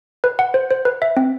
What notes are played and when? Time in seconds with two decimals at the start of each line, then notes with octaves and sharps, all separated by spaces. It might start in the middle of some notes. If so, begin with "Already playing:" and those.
0.24 B4
0.39 F#5
0.54 C5
0.71 C5
0.85 B4
1.02 E5
1.17 C4